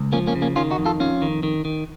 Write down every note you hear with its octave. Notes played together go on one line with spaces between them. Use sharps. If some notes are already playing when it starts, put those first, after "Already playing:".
Already playing: C#2
F3 A#3 C#4
A#3 C#4
C#3
A#3 C#4
D#3 C#4 F4
D#4 F#4
F2
F4 A4
F2 C#4 F4
D#3
D#3
D#3